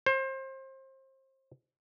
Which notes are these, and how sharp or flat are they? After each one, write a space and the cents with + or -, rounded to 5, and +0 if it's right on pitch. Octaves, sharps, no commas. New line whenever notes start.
C5 +30